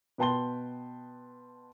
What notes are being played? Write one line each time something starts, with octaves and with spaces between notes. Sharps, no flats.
B2 B4 G5 A5 C6 G7